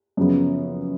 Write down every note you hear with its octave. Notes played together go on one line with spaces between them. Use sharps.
F#2 C#3 F3 B3